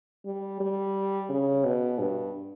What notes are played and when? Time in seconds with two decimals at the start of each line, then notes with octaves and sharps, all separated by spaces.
0.25 G3
0.61 G3
1.30 C#3
1.64 B2
1.99 G2